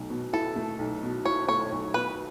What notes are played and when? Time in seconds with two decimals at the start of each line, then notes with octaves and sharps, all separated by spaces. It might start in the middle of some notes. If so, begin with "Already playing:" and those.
Already playing: B1 A3
0.10 B2
0.33 E4 A4
0.56 A3
0.79 B1
1.03 B2
1.25 E4 C#5
1.48 A3 C#5
1.72 B1
1.94 B2 B4